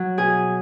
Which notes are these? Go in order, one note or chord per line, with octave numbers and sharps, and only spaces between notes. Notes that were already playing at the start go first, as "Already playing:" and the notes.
Already playing: F#3
B2 G#4 G#5